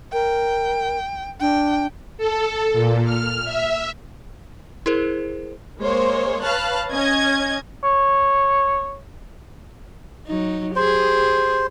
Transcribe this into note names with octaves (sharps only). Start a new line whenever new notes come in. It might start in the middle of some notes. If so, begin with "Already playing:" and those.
A#4 G5
D4 G5
A4
A#2
F6
E5
E4 G#4 A#4 C5
G#3 A#3 C5 C#5
B4 C#5 F5 A5 F6 F#6
C#4 D#5 G#6
C#5
F#3 D#4
G4 G#4 C5